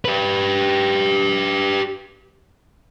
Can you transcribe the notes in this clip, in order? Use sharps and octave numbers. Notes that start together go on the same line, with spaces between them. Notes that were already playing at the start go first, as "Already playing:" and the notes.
G4 B4